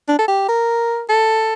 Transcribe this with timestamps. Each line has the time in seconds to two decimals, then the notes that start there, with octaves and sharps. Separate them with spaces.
0.08 D4
0.19 A4
0.28 G4
0.49 A#4
1.09 A4